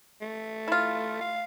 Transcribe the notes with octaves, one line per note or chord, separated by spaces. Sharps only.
A3
E4 F4
F5